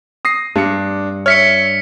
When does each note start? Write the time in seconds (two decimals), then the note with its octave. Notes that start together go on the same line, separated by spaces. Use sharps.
0.25 D#6 A#6 C7
0.56 G2 D4 C#7
1.26 C#5 E5 F6 B6 C#7